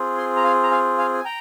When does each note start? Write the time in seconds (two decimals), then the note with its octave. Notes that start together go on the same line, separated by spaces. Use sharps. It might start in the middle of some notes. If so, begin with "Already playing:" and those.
Already playing: C4 F4 G#4
0.17 G#5 C6
0.36 A#5
0.44 F5 G#5
0.63 A#5
0.71 F5 G#5
0.98 F5 G#5
1.13 G#5
1.25 G5 A#5